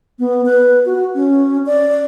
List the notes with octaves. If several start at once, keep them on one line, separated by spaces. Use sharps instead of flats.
B3
B4
F#4
C#4
D5